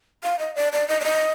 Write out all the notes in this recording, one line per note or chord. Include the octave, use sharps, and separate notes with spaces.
F5
D#5
D5
D5
D#5
D5
D#5